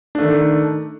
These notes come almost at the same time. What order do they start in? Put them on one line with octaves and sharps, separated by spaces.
D4 A3 D#3